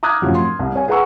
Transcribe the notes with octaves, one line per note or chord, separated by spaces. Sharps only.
A#5 D6 D#6 F6 F#6 G#6
F#2 A2 C3 F3 F#3
C6
C2
C#5 G#5
G#4 B4 F#5 A#5 C#6 E6